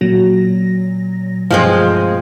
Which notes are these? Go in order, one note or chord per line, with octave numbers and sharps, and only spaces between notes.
A#2 F#3 A#6
G2 B2 F3 G#3 A3 C4